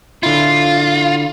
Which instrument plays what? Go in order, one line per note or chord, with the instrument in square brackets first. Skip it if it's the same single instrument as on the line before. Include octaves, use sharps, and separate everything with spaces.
[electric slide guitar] D3 E4 [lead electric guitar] F4